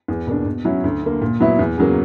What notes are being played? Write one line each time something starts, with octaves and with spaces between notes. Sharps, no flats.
E2
B2 A#3 D4
B2
F#3 C#4 E4
D2
D3 A#3
A#2
F#3 B3 E4
E2
C#3 F#3 A#3